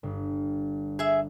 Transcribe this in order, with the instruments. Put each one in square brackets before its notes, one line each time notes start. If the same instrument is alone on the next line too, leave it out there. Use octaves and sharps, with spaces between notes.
[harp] G1
[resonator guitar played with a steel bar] G#4 E5